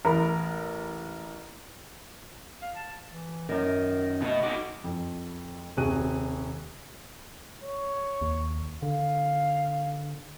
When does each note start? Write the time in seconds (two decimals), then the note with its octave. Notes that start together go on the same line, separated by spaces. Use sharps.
0.05 A1 E2 A#4 A#5 B5
2.62 F5
2.76 A5
3.07 E3
3.49 F#2 D#3 A#4
4.22 B2 A3 D#5
4.43 D#4 F#4 D6
4.84 F2
5.77 D#1 C3 F#4 G#4 F#6 D#7
7.64 C#5
8.22 D#2
8.82 D3 F5